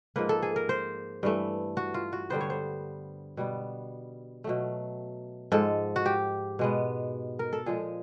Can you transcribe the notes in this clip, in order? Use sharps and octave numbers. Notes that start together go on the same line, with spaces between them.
G#2 F3 A#3 B4
A4
G#4
A#4
C5
G2 E3 A3
F#4
F4
F#4
D3 G3 B3 C5
C#5
C5
B2 G3 B3
B2 F#3 A3
G#2 F3 G#3 A4
F#4
G4
B2 G#3 B3
A#4
A4
A#2 F3 G#3 G#4